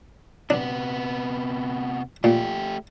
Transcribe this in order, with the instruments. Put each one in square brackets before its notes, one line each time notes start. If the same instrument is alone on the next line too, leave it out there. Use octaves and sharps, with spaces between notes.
[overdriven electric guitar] C3 B3 [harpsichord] D4
[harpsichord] A#2 [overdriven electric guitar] A3 G4